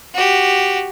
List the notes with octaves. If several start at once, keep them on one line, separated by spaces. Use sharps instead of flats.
F#4 G4